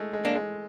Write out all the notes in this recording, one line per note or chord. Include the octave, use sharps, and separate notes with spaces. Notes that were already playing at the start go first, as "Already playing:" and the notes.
Already playing: G#3 A3
G#3
A#3 D4
G#3